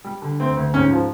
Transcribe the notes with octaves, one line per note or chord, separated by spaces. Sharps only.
G3
D3
D2 C4
D2
G#2 C#4
F3